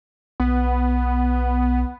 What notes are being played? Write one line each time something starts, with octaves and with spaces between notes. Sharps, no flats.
B1 B3